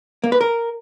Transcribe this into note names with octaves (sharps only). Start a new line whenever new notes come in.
A#3
B4
A#4